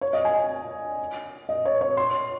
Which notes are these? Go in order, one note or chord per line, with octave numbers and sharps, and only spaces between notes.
C#5
D#5
G#5
D#5
C#5
C#5
C6